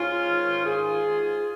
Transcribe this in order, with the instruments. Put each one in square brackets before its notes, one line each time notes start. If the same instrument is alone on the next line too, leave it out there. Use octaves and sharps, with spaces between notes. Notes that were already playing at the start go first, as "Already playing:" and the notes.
Already playing: [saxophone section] G#2 C#4 F4
D#3
G#2 F4 G#4
G#2